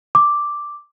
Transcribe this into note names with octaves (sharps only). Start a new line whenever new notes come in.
D6